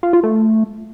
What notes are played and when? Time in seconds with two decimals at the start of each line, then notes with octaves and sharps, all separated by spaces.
0.03 F4
0.13 F4
0.23 A3